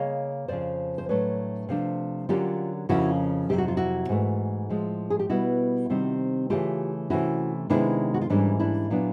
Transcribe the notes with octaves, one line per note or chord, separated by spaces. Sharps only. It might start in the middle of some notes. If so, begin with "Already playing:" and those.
Already playing: C#3 A#3 C#5 D#5
F2 C#3 F3 C5 D5
C5
A2 F#3 A3 D4 B4 C#5
C3 F3 A3 D4
D3 F#3 A#3 C#4 F4 G4
F2 C#3 F3 A#3 C#4 E4 F#4
F2 C3 D#3 F#3 G4
F#4
F4
E4 F#4
G#2 E3 A3
A2 F3 G#3
G#4
G4
B2 G3 B3 E4 F#4
C3 D#3 G3 C4
C#3 E3 A3 F4 G4
C3 E3 A3 C#4 E4 F#4
C3 D#3 G#3 B3 D4 E4
F#4
F4
G#2 E3 G3 A#3 C#4 D4 E4
D4 E4
A#2 F#3 B3 D4